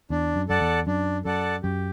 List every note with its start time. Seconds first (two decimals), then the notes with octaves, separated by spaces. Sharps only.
0.10 E2 D4
0.36 F#2
0.49 F#2 A4 D5 F#5 A5
0.61 E2
0.87 F#2 D4
1.25 F#2 A4 D5 F#5 A5
1.63 F#2 G4